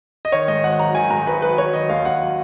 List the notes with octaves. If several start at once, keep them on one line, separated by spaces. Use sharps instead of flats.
D#5
D#3 C#5
G#2 D#5
G#1 F#5
F#3 A#5
D#3 G#5
G#2 A#5
G#1 B4
F#3 B4
F#3 C#5
D#3 D#5
D#2 F5
D#2 F#5
F#3